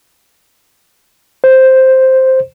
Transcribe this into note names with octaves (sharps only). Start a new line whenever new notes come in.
C5